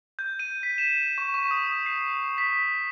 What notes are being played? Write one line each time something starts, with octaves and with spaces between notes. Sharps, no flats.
G6
D#7
B6
E7
C#6
C#6
D#6
C7
B6